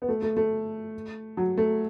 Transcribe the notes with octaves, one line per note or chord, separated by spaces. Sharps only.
B3
A3
A3
A3
F#3
A3